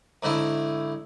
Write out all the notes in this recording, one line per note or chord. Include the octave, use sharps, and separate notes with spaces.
G#2 D3 A3 E4